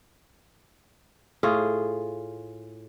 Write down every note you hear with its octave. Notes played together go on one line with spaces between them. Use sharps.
A2 F4 G#4